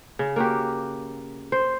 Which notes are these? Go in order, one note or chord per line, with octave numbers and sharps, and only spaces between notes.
C#3
A#3 F#4 G4
C5